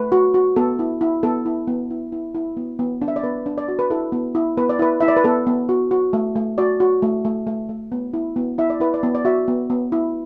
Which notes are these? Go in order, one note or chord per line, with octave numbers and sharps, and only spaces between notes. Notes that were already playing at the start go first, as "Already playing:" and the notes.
Already playing: A3 B4
F#4
F#4
B3 A4
E4
E4
B3 A4
E4
B3
E4
E4
E4
B3
B3
D4
E5
D5
B3 B4
D4
D5
F#4
B4
E4 A4
B3
E4
B3 B4
D5
E4 B4
E4 E5
D5
B4
B3 A4
B3
F#4
F#4
A3
A3
F#4 D5
F#4
A3
A3
A3
A3
B3
E4
B3
E4 E5
D5
E4 B4
D5
B3
D5
F#4 E5
B3
B3
E4